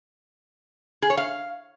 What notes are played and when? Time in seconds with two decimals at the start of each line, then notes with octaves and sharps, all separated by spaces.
1.02 G#4
1.10 C#5
1.17 F5